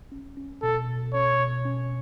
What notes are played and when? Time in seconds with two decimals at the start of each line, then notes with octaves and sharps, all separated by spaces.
0.12 C#4
0.37 C#4
0.62 B2 A4
0.88 B2
1.13 C#4 C#5
1.39 B2
1.65 C#4